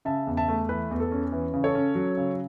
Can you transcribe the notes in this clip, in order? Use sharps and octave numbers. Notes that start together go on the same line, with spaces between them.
C#3 E5 A5
E2
E5 A5
A3
E3 B4
E2
A4
C#4
E3
C#3
A4 C#5
C#4
F#3
C#3